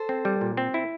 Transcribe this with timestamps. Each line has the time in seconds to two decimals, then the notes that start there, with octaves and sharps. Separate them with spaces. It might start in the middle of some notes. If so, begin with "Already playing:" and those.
Already playing: A4 C5
0.09 C4
0.25 G3
0.41 A#2
0.57 C4
0.74 E4